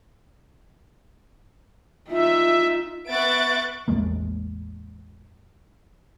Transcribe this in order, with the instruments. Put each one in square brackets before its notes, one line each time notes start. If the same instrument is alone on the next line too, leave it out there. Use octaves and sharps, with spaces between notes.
[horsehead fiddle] D#4 F4 [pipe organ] E5
[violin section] B3 E5 C#6 F#6 A6 D7
[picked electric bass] A1 E2 G#3 A#3